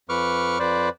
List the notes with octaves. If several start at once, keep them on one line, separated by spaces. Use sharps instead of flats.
F2 B4 C#6 D6 F6
F2 B4 C5 D5